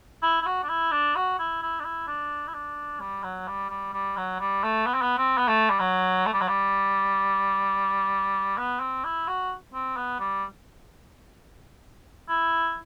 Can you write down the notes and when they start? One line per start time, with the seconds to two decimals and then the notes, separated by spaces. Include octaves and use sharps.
0.22 E4
0.41 E4
0.46 F#4
0.63 D4
0.69 E4
0.92 D4
1.16 F#4
1.39 E4
1.62 E4
1.80 D4
1.84 E4
2.07 D4
2.48 E4
2.54 D4
3.00 G3
3.23 F#3
3.48 G3
3.70 G3
3.93 G3
4.17 F#3
4.40 G3
4.63 A3
4.86 B3
4.94 C4
5.02 B3
5.18 C4
5.37 B3
5.47 A3
5.70 G3
5.80 F#3
6.26 A3
6.33 G3
6.41 F#3
6.48 G3
8.57 B3
8.80 C4
9.04 E4
9.28 F#4
9.74 C4
9.96 B3
10.20 G3
12.29 E4